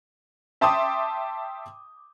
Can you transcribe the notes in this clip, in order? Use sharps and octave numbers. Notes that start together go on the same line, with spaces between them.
E5 G5 A5 C6 D6 D#6